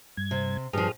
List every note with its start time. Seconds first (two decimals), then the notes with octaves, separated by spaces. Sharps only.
0.17 G2 G#6
0.31 C3
0.73 G2 F3 G#4 D#6 F6